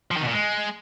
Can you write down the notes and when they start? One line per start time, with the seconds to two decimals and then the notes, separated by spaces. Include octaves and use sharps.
0.11 F3
0.17 D#3
0.22 B2
0.28 A#2
0.33 G#3